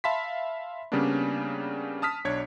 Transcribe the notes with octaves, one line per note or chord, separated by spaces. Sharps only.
E5 F5 A5 B5 C6 B6
C#3 G3 A#3 B3 C#4 D4
A5 D#6 F6 B6
B1 D4 C#5 G#6